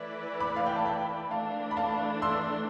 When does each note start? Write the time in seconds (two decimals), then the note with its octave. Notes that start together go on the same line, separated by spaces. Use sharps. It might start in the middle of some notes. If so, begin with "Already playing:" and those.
Already playing: E3 A3 E4 B4 D5
0.40 B5 D6
0.56 F5
0.66 G5
0.76 A5
0.86 G5 B5
1.31 E3 A3 D4 F5 A5
1.71 B5
1.77 F5 A5
2.22 C6 E6